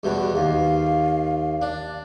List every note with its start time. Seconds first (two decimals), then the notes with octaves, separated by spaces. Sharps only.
0.03 E2 G2 B2
0.35 D#2 F5
1.62 D4